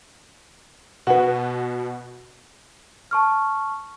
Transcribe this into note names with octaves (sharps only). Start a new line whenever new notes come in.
B2 B3 F#4 B4
A5 C#6 F6